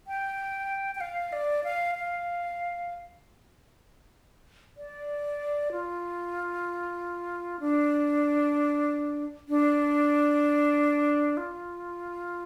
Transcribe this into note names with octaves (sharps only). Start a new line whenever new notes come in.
G5
G5
F5
D5
F5
F5
D5
F4
D4
D4
F4